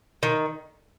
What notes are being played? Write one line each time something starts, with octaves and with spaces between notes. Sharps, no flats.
D#3